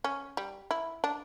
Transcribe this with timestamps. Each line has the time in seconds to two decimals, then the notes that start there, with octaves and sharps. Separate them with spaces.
0.04 C#4
0.37 G3
0.71 E4
1.04 D4